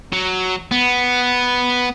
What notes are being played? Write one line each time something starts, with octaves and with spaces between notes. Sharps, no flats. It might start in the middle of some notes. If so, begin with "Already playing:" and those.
F#3
B3